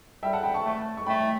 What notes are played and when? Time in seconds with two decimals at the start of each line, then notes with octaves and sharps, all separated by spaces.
0.23 G3 E5 G5
0.33 F#5 A5
0.43 G5 B5
0.54 A5 C#6
0.64 A3
0.97 C#6
1.06 A3 G5 B5